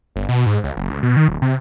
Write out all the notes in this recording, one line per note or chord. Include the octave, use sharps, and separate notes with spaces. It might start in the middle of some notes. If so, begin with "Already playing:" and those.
G1
B2
G#2
C#2
F#1
C#2
B2
D#3
D1
C3